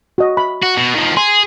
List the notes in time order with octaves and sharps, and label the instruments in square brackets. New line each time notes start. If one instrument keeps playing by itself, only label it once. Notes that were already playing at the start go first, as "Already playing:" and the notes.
[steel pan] F#4 D#5
B5
[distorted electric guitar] F#4
B2
D#3 F3
[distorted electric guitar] G#4 [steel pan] C6